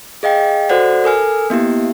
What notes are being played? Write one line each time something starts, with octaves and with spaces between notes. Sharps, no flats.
G#4 D#5 F5 G5
F#4 A4 C5 D5 F#5
A4 A#4 G#5 F6
A#3 B3 E4 G4